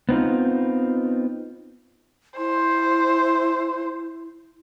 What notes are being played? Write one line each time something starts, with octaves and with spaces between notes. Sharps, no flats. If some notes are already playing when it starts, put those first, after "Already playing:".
B3 C4 D#4 F4
E4 C5